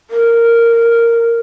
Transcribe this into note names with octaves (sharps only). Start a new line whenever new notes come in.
A#4